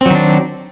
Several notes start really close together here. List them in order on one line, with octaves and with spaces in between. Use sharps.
C4 F#3 D#3 D4